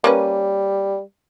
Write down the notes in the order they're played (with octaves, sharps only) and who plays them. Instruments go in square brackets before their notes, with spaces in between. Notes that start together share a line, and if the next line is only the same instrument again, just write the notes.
[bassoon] G3 [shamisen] A#3 C#4 B4